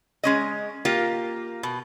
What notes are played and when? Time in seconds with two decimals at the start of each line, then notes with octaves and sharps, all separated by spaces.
0.24 G#3 C#4 D#5
0.85 A#3 F4 G4
1.63 B2